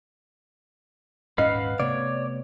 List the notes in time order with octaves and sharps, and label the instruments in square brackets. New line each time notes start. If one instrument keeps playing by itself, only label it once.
[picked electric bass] D#1 G#2 C#4 [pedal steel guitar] B4 F5 F6 [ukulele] D#5 F#5
[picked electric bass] C3 A3 B3 [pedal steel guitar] C#5 [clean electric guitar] D5